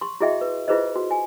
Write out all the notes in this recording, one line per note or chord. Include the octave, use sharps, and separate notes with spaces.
C6 C#6
E4 F#4 G#4 D#5 E5 G5
B4
E4 F4 G#4 B4 C5 D#5
F#4
G#5